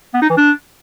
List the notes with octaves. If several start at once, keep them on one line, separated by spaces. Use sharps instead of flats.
B3
D#4
E3
D4